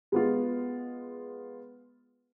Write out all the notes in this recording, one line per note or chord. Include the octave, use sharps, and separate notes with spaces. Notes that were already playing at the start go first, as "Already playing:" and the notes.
G#3 B3 F4